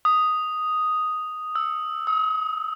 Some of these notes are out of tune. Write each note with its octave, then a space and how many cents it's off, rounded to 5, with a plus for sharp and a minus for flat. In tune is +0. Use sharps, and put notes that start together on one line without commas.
D#6 +0
E6 +0
D#6 +40